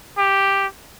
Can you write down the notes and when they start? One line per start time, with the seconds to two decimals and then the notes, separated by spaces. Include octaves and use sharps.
0.18 G4